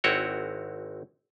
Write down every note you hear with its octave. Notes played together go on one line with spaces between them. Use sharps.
G#1 C4 E4 F#4 C#5 G5